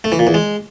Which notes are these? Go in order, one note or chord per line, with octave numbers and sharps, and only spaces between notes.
A3
E3
A#2
E2
G#3